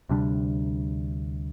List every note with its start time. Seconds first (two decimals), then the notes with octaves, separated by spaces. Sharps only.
0.09 D2 C3 G3 D4